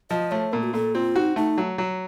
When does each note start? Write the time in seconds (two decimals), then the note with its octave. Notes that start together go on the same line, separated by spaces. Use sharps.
0.10 F3 D#5
0.31 A3 C#5
0.52 A#2 A#4
0.63 F#4
0.74 A#2 A4
0.95 C4 F4
1.16 D#4 F#4
1.36 A3 D#4
1.58 F#3
1.78 F#3